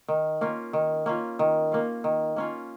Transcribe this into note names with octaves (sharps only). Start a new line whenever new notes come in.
D#3
A#3 C#4 F4
D#3
A#3 C#4 F4
D#3
A#3 C#4 F4
D#3
A#3 C#4 F4